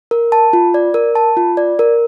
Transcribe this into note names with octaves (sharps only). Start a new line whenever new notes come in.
A#4
A5
F4
D5
A#4
A5
F4
D5
A#4